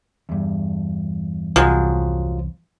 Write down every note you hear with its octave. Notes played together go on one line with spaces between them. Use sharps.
E2 G2
C2 F3 F#3 G#3